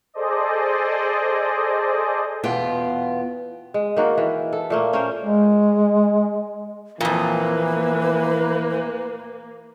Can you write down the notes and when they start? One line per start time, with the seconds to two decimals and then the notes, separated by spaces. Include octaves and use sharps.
0.14 G#4 A4 C5 D5 D#5
2.44 E2 B2 B3 F4 G5
3.74 G#3
3.97 D#3 A#3 F#4
4.18 E3
4.53 A4
4.70 A#2 A3 A#3
4.93 C#4 A#4 C5
5.23 G#3
7.01 F2 A#2 E3 A#3 B4